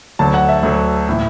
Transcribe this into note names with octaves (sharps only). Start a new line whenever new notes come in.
D2 D3 F#3 A5
F#5
E5
D2 D3 F#3
A2 E3